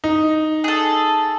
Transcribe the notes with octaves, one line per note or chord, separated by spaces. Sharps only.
D#4
G#4 A4